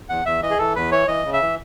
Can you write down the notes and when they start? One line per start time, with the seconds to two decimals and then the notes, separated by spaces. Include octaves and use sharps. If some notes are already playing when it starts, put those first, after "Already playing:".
0.09 E2 F#5
0.25 E2 E5
0.42 E3 D#5
0.50 G#4
0.58 E3 A4
0.76 E2 B4
0.91 E3 C#5
1.08 E3 D#5
1.25 C#3
1.33 E5
1.42 E3